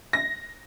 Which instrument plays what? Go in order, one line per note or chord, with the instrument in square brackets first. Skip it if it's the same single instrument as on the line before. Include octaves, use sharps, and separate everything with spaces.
[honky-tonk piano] A#6